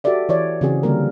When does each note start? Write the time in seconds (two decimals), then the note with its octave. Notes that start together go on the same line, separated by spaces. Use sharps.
0.04 F#4 G4 A4 D5 E5
0.29 E3 C#5 D5
0.61 C#3 E3 C4 F#4 G#4
0.83 D3 F3 G3 A#3 A#4